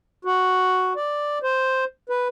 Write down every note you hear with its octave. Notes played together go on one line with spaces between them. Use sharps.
F#4
D5
C5
B4